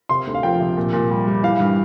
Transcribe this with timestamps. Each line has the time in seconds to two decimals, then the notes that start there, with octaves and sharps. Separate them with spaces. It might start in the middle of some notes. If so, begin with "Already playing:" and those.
0.09 C3 C6
0.27 D2
0.34 F5
0.43 F3 G5
0.60 C3
0.77 A#2
0.93 A#2
1.10 G3
1.27 G3
1.43 E3 F5
1.60 G2